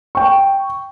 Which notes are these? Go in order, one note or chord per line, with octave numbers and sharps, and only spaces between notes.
G5 C#6